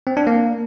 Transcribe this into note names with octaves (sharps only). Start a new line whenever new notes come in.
C4
D4
A#3